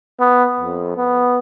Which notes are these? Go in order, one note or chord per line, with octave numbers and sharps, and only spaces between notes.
B3
F2
B3